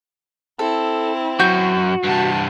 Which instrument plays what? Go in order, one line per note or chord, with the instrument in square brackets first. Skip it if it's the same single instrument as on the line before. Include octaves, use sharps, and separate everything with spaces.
[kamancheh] C4 E4 [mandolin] A4
[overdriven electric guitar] F#2 [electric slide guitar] F#4 [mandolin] G6
[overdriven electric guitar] G2 C3 [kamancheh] F#5 A5